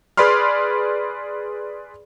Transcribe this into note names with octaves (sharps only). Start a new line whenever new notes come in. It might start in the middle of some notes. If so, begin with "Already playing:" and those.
G#4 B4 D5 B5 C6 F6